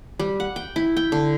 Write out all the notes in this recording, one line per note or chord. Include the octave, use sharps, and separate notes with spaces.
G3
F#5
G5
E4
G5
D3